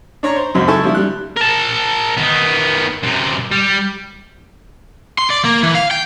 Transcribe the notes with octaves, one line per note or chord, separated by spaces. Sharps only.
D4 C#5 A#5 C#6
C5
C#2 F#2 F#3 C4
E4 A4 G#5 A5 C#6
F3 G3 E4
G3 F#6
A#4 A5
D#3 B3
F#2 C3
G3
C6
D5
A#3
E3
F5
G5